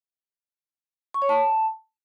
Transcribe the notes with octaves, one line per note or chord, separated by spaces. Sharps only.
C#6
C#5
A5